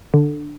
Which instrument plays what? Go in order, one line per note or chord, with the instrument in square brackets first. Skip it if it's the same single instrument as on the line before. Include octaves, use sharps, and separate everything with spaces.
[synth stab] D3